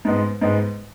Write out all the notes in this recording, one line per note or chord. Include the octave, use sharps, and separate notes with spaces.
G#2 G#3 B3
G#2 G#3 B3